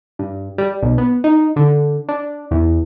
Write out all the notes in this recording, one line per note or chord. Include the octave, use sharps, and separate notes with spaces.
G2
G3
B1
B3
D#4
D3
D4
E2